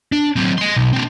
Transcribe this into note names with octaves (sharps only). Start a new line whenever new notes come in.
D4
F#3 C4
D#5 C6
B1
C4 D4